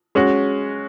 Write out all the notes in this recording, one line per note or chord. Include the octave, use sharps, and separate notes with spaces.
G#3 C#4 F#4